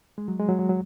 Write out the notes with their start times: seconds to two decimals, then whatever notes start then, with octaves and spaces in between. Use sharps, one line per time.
0.18 G#3
0.28 F#3
0.39 G#3
0.49 F#3
0.59 F#3
0.69 F#3